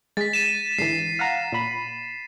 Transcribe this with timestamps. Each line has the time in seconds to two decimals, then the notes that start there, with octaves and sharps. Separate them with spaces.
0.17 G#3 A6 B6
0.33 A6 B6 D#7 E7
0.78 G#2 D3 E3 C7
1.19 F5 F#5 A#5
1.52 A#2 B5